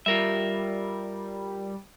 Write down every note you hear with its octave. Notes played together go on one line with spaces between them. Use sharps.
G3 F4 A#4 E5